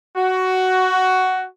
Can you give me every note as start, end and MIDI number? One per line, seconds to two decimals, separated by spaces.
0.16 1.46 66